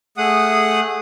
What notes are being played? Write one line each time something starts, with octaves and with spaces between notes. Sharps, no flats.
A3 G#4 F#5 D#6